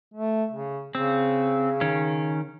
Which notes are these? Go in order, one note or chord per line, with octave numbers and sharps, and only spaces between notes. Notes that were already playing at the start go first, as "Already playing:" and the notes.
A3
C#3
C#3 C4
D#3 C#4